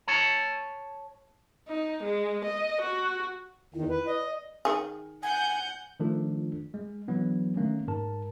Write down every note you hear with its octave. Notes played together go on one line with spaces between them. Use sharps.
C#5 A5
D#4
G#3
D#5
F#4
E2 D#3 E4
B4
D5 D#5
D#3 G#4
F#5 G#5 G6
D#3 F3 A3 D4 F4 A4
G#3
E3 F#3 B3 D4
D#3 A3 A#3 C#4
G#2 A#4 A5